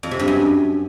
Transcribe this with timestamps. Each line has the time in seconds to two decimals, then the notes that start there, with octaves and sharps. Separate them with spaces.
0.03 F2
0.11 C3
0.19 G2
0.28 F#2